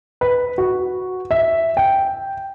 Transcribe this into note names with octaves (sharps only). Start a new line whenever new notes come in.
B4
F#4
E5
G5